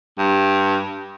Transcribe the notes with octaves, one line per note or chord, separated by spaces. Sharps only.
G2